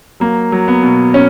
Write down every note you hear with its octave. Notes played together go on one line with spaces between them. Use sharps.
F#3 A#3
F#3
B3
B2
C#4